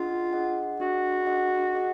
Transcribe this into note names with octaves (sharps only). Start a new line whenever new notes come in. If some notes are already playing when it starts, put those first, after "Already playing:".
Already playing: D4 F4 G#4 D#5 F#5
D4 G#4 D#5 F#5
D4 F#4 G#4 D#5 F#5
D4 G#4 D#5 F#5
G#4 D#5 F#5